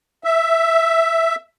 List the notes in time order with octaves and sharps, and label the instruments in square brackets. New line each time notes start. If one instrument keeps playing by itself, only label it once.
[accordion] E5